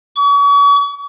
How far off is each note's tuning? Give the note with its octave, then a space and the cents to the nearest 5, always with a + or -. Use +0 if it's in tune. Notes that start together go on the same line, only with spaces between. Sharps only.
C#6 +40